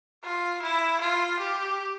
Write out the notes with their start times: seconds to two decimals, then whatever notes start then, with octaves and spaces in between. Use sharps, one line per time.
0.24 F4
0.62 E4
1.01 F4
1.39 G4